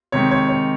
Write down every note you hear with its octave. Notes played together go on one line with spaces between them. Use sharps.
C3 D#3 G#3 C#5
C#5
C#5